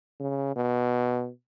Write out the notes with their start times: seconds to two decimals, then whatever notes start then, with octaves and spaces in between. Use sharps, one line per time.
0.20 C#3
0.56 B2